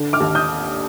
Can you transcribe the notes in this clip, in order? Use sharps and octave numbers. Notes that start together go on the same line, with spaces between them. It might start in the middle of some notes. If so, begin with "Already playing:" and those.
Already playing: D3
D6 F6
D#2
D#6 G6